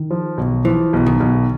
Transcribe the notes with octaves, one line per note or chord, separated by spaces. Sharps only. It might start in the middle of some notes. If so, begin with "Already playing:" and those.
Already playing: D#3
F3
B1
E3 F3
B1
D#3
B1